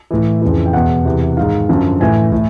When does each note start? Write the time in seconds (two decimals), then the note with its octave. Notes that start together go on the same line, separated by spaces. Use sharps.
0.11 A2 E3
0.42 F2 C#3 E3
0.66 G5
0.73 E2 B2 F#5
1.05 E2 C3 E3
1.37 G#2 D#3 F5
1.69 F#2 D3 F3
2.00 A2 E3 G#5
2.32 A2